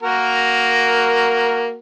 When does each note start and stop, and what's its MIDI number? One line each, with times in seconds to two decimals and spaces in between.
0.03 1.75 58
0.03 1.75 66
0.03 1.75 70